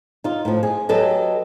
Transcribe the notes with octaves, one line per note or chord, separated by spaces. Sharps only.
D#4 F4
A2 F3
G#4
F#3 G4 A4 B4 D#5